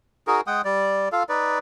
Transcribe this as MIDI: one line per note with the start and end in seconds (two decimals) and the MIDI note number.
0.27 0.41 63
0.27 0.41 66
0.27 0.41 68
0.27 0.41 70
0.47 0.62 56
0.47 0.62 78
0.47 0.62 79
0.47 0.62 87
0.65 1.09 55
0.65 1.09 74
1.12 1.23 65
1.12 1.23 69
1.12 1.23 77
1.29 1.59 63
1.29 1.59 71
1.29 1.59 74